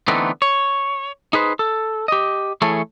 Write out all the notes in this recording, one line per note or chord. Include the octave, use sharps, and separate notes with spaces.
D3 E3 A3 B3 C4 D#4
C#5
D#4 G#4 B4 C5
A4
G4 D#5
E3 A3 E4 G#4 A4 C#5